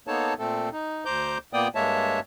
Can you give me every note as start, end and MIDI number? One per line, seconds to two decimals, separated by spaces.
0.07 0.34 58
0.07 0.34 59
0.07 0.34 63
0.07 0.34 69
0.07 0.34 73
0.07 0.34 81
0.39 0.69 46
0.39 0.69 57
0.39 0.69 60
0.39 0.69 69
0.72 1.04 63
1.05 1.38 38
1.05 1.38 72
1.05 1.38 82
1.05 1.38 86
1.05 1.38 91
1.53 1.68 46
1.53 1.68 58
1.53 1.68 59
1.53 1.68 74
1.53 1.68 79
1.53 1.68 87
1.75 2.20 43
1.75 2.20 56
1.75 2.20 58
1.75 2.20 73
1.75 2.20 76
1.75 2.20 81